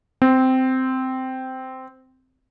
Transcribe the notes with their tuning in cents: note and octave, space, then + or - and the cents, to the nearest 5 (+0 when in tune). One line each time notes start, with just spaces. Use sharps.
C4 -10